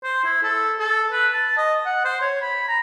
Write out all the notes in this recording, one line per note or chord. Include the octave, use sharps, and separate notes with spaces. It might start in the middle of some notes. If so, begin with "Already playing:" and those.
C5
E4
A4
A4
B4
A5
D#5
F#5
C5
C#5
B5
A#5